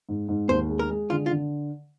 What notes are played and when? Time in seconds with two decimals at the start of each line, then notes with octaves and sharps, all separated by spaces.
0.09 G#2
0.29 G#2
0.49 D#2 C5
0.69 G#3
0.79 A#4
0.90 G#3
1.10 D3 F4
1.26 F4
1.31 D3